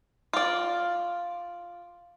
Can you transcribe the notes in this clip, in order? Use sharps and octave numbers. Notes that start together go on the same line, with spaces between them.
F4 D5